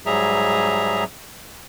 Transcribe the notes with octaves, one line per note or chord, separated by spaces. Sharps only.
G#2 F#3 G3 G#4 E5 A#5